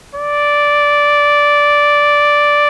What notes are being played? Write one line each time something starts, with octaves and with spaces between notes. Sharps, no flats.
D5